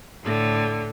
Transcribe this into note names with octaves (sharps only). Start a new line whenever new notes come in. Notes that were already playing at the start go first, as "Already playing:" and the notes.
A2 D3